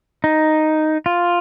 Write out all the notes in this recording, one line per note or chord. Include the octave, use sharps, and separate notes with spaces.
D#4
F4